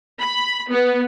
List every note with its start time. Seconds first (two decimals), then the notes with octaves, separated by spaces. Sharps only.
0.19 B5
0.69 B3